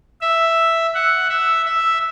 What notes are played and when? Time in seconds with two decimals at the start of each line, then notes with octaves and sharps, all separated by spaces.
0.21 E5
0.94 F#5
1.30 E5
1.66 E5